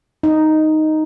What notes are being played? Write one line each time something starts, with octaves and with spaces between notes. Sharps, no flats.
D#4